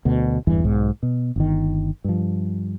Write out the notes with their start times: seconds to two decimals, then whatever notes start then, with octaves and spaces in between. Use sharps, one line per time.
0.05 D2 B2
0.47 D1 E2 G2 E3
0.64 B1 G#2
1.03 B2
1.36 G1 D#3
2.04 G2 F3